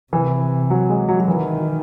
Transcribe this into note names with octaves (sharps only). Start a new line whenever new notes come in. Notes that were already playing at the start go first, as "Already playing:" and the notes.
C3 E3
F#3
G#3
F#3
F#3
D#3 E3